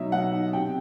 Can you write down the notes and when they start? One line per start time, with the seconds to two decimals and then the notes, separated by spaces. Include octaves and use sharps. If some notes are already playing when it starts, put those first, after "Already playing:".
Already playing: B2 F#3 D#4 E5
0.12 B2 F#5
0.32 D#4
0.53 C3 G5